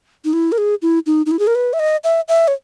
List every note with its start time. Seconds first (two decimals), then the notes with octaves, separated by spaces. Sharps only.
0.25 D#4
0.33 E4
0.52 A#4
0.58 G#4
0.82 E4
1.06 D#4
1.26 D#4
1.31 E4
1.39 G#4
1.47 A#4
1.55 B4
1.73 E5
1.79 D#5
2.04 E5
2.28 E5
2.48 C#5